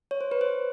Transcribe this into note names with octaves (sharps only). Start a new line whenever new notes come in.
C#5
C5
B4
C5